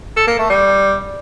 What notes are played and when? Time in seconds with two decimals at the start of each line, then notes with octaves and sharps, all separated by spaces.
0.17 A4
0.27 A#3
0.39 A3
0.50 G3